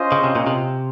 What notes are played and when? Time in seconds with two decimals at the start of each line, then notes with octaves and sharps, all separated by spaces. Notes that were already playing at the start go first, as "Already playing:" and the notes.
Already playing: C#4 F4 C5 D#5
0.12 C#3
0.24 C3
0.35 A#2
0.47 C3